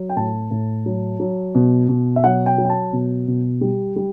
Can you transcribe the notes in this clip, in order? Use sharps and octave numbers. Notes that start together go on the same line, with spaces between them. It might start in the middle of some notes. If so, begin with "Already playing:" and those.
Already playing: F#3
G5
A2 A5
A2
F#3
F#3
B2
B2
E5
F#3 F#5
G5
F#3
G5
A5
B2
B2
G3
G3